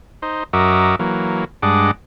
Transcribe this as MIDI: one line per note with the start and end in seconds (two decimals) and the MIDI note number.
0.22 0.44 63
0.22 0.44 72
0.53 0.95 42
0.53 0.95 66
0.53 0.95 70
0.53 0.95 75
0.53 0.95 76
0.53 0.95 86
0.99 1.45 52
0.99 1.45 54
0.99 1.45 58
1.62 1.91 43
1.62 1.91 56
1.62 1.91 62
1.62 1.91 75
1.62 1.91 78
1.62 1.91 86